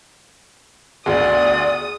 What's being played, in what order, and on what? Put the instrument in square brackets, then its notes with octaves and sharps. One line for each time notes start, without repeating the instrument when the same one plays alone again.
[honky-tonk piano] G1 D2 [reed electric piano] G#4 [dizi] D5 [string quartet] D#6